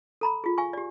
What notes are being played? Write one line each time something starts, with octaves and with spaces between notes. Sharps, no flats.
A4 A#5 B5
F4 G#4
F5 G#5 C#6
G4 D5